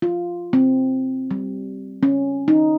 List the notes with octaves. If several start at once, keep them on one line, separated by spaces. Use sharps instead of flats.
F4
C4
G3
C#4
D#4